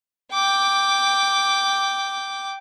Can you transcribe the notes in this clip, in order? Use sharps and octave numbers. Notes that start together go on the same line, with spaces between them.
G5 D6